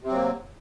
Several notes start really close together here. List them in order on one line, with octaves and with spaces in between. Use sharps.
C3 C4 F#3 A#3